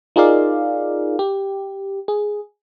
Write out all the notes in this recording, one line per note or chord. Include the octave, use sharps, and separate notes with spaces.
D#4 F4 G#4 A#4 D5 F5
G4
G#4